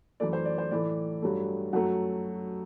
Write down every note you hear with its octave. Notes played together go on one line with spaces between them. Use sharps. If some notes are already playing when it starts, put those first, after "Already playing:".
F#2 E3 A3 D5
C5
D5
C5
A2 E3 A3 D5
G2 F#3 A3
F#2 F#3 A3 F#5